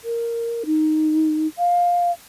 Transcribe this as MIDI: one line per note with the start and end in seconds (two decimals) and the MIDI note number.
0.04 0.63 70
0.66 1.47 63
1.58 2.11 77